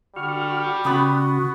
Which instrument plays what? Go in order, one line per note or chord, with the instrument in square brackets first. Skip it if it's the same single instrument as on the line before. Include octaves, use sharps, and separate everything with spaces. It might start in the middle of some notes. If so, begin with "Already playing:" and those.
[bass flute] D3 [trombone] G3 [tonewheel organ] F#4 C#6 F6
[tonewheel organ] C#3 [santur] B3 B5 D#6 [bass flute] F#4